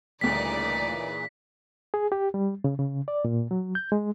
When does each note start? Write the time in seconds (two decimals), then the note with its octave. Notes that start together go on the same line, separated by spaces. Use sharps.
0.21 D2 A#2 C#3 E3 G3 D#4 D5 B6
1.94 G#4
2.12 G4
2.34 G3
2.64 C#3
2.79 C#3
3.08 D5
3.25 A#2
3.51 F#3
3.75 G6
3.92 G#3